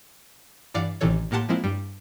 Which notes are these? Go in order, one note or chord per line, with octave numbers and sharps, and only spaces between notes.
G2 E3 D5 F5 F#5 D6
A1 C3 D#3 E3 A4 C#5
A2 A#3 G4 F#5 A5 C6
F3 G#3 A#3 C4 E4
G2 G3